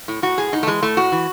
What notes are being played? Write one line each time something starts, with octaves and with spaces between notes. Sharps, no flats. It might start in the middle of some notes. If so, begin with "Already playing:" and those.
A2
A2 F#4
A2 G#4
A2 D#4
A3
E3 G#3
A2 A3
A2 F#4
E3